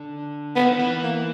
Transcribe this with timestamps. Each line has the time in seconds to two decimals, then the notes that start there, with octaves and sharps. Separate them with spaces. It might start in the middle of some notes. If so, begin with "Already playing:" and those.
Already playing: D3
0.56 F3 B3
0.63 E3
0.71 D#3
0.79 E3 B3
1.03 A#3